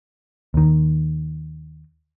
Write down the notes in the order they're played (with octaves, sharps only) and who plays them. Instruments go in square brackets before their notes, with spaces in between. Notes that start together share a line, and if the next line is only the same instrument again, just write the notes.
[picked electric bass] D#2 D#3